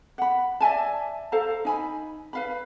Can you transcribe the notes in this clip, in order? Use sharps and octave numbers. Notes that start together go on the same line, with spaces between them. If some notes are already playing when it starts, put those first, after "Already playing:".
F#5 B5
D5 E5 G#5 A5
A4 C5 F5 A#5
D#4 G#5 B5
B4 F5 B5